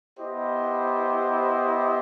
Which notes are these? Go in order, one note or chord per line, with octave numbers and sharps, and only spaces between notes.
B3 E4 G4 C5 D#5